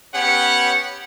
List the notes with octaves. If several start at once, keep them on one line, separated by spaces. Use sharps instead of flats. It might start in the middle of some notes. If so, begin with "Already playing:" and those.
B3 C#4 G4 C#5 F#5